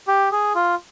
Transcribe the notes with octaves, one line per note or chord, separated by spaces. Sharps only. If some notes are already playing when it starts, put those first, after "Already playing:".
G4
G#4
F4